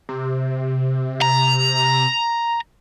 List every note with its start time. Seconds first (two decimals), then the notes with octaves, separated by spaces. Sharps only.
0.09 C3
1.22 A#5